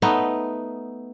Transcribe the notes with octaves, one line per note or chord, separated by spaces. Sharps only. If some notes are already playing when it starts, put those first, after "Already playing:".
A3 B3 D#4